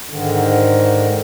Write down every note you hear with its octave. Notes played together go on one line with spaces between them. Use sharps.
G#2 D3 D#3